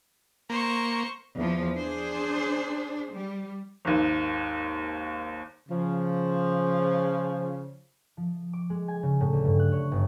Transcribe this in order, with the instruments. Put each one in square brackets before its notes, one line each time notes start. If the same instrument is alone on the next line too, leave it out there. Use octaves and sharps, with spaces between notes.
[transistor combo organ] A#3 [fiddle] C5 C#6
[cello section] E2 F3
D4 G#4 C5
G3
[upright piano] G#1 D#2
[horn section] C#3 F3
[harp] F3
D6
G#3
G#5
C#3
A2
D2
G2
F#6
C#5
G1